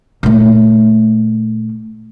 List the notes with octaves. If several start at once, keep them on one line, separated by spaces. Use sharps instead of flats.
A#2 A3